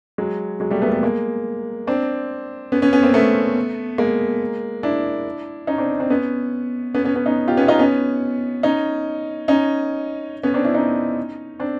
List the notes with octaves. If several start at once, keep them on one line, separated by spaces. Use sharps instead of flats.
F#3 G#3
F#3 G#3
G3 A3
A3 B3
A#3
G3 A3
G#3 A#3
C4 D4
B3 C#4
B3 C#4
B3 C#4
A#3 C4
A3 B3
G#3 A#3
D4 E4
C#4 D#4
C4 D4
C4 D4
B3 C#4
B3 C#4
B3 C#4
B3 C#4
C#4 D#4
F4 G4
B3 C#4
D#4 F4
B3 C#4
C#4 D#4
C#4 D#4
B3 C#4
C4 D4
D4 E4
C#4 D#4
C4 D4